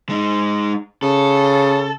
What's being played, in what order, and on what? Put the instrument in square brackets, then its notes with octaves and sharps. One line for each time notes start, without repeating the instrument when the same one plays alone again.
[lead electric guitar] G#3 D#4
[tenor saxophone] C#3 [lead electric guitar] A4